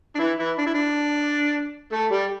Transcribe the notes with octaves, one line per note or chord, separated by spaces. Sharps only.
D4
E3 E4
E3 E4
D4
E4
D4
A3 A4
G3 G4